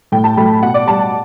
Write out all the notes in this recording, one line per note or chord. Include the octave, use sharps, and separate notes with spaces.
A2 G5
A5
F#3 A3 B5
B2 F#5
D5
G3 A5
A5